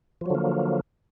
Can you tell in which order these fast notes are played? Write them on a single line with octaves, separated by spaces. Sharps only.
F3 F#3 D3 A#3